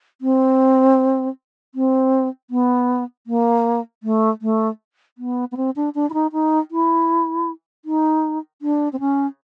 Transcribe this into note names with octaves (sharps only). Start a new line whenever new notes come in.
C4
C4
B3
A#3
A3
A3
B3
B3
C4
D4
D4
E4
D#4
D#4
E4
D#4
D4
C4
C#4